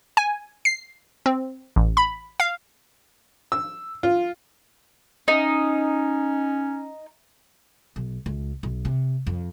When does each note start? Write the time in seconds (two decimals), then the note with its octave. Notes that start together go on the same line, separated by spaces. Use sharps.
0.17 G#5
0.65 C7
1.26 C4
1.76 A1
1.97 B5
2.40 F5
3.52 E6
4.03 F4
5.28 C#4 D#4
7.96 B1
8.26 C#2
8.63 B1
8.85 C3
9.26 F2